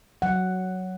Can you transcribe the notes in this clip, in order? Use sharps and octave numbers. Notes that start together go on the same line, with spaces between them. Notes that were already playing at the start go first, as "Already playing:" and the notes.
F#3 F#5